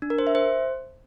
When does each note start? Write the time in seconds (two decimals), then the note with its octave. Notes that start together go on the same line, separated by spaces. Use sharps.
0.02 D4
0.10 A#4
0.19 C5
0.27 E5
0.35 C5